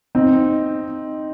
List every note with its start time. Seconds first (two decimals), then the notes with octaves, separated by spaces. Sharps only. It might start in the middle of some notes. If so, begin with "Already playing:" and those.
0.15 C4 D#4